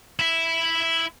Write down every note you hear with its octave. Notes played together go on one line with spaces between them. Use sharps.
E4 E5